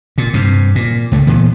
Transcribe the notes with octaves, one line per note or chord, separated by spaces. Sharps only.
A#2
G2 C3
A#2
C#2 A3
A#2 E3 B3